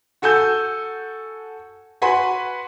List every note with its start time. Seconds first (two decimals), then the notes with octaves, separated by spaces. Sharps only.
0.22 F#4 A4 G#5 E6 G6
2.02 F#4 B4 G#5 B5 C6